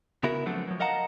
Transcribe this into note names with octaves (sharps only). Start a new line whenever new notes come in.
C#3 B3 E4 F#4 A#4
F3 F#3 A3 B3 C4 D4
F3 F#3
A#4 D#5 F5 F#5 A5 A#5